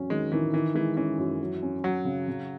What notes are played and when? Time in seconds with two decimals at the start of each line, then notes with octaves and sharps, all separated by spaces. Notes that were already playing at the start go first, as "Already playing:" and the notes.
Already playing: E2 F#3 C#4
0.10 D#3 G#3
0.32 D#3 E3
0.53 D#3 E3
0.75 E3 G#3
0.96 E3 C#4
1.18 F#2
1.40 F#3
1.63 C#4
1.84 F#3 F#4
2.05 C#3
2.28 C#3